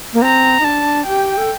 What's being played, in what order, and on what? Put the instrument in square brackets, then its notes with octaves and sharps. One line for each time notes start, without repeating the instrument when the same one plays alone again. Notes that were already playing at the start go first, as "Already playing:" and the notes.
[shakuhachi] A#3
[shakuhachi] C4 [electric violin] A#5
[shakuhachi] D#4
[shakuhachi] D4 [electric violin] A5
[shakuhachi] G4 [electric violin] G5
[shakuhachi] A4